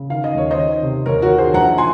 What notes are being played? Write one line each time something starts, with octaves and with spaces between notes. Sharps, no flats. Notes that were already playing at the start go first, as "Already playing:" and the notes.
Already playing: C#3
D#3 F5
D#5
D#2 C#5
C5 D#5
D#3
C3
D#2 A#4 C#5
F#4 A#4
D#3
G#4 C5
A#1 F#5 A#5
A#2 G#5 C6